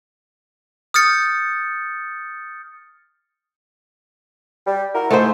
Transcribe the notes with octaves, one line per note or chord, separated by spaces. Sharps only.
D#6 F6 G6 A6 C#7
G3
E4 F#4 A#4
G#2 A3 E4 C5